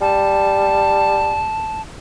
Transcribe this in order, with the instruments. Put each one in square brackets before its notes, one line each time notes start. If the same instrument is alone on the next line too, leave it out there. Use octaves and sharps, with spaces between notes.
[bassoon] G3 [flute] A5